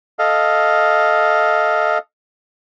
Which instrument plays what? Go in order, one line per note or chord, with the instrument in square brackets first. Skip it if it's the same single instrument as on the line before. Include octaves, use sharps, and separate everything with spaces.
[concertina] A4 D#5 F5